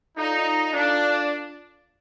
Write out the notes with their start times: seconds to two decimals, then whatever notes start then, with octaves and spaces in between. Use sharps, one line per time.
0.17 D#4 F4 A4 D5 F5
0.73 D4 F4 A4 D5 F5